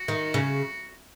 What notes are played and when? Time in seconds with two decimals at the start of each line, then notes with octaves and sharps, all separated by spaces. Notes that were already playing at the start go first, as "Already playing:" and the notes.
Already playing: F#4
0.08 D#3
0.34 C#3